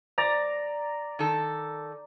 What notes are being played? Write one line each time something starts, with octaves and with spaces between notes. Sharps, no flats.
D5 A#5
D#3 A4